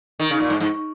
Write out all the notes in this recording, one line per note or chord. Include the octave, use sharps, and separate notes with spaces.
D#3
C#3
A#2
G#2
G#2